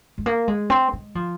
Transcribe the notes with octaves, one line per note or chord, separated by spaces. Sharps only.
G#3
A#3
G#3
C4
G#3
F3